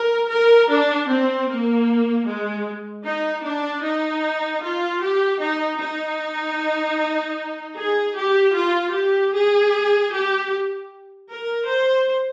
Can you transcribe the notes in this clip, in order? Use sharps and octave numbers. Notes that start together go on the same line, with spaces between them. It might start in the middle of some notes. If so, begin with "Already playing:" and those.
Already playing: A#4
A#4
D4
C4
A#3
G#3
D#4
D4
D#4
F4
G4
D#4
D#4
G#4
G4
F4
G4
G#4
G4
A#4
C5